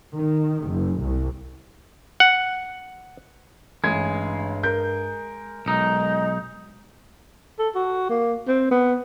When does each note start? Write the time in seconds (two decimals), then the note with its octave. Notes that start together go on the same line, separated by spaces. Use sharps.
0.15 D#3
0.69 F#1
1.01 C2
2.20 F#5
3.84 A1 G2 G#3 G#6
4.63 A#4 G6
5.66 B1 G#3 D#4
7.59 A4
7.75 F#4
8.10 A#3
8.48 C4
8.71 B3